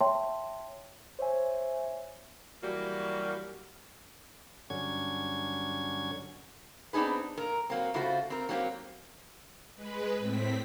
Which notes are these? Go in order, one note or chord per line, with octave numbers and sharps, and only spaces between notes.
C#5 E5 G5 A5 C6
C5 C#5 E5 G#5
E3 F#3 G3 A#3 F#4
G2 D3 F#3 C#4 G#6
B3 C4 D4 D#4 G#4 B4
A#2 A#4 A#5
F#3 A#3 C4
C#3 A3 F4 F#4 C5
C4 A#4
F#3 A#3 C4 F4 G4
G#3 B4
A2 C4 B6